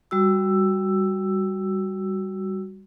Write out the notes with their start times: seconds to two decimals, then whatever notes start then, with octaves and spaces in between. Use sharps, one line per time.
0.11 G3 F#4 E6